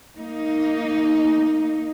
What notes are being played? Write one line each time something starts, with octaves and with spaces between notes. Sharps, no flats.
A#3 D#4